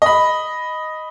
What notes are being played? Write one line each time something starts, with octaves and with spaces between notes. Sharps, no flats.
D#5 B5